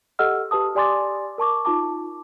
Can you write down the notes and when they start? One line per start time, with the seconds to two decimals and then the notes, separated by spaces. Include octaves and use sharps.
0.19 G4 A4 D#5 F#5 E6 F6
0.51 G4 B4 A5 D#6
0.75 G4 D5 G#5 C6 D6 A6
1.38 A#4 A5 C#6 D6
1.65 D#4 F4 A5 D6